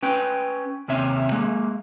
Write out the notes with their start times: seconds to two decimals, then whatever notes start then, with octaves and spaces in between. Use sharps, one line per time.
0.03 C#4 B4 G5
0.88 D#2 C3 C#4 E5
1.32 G#3 A#3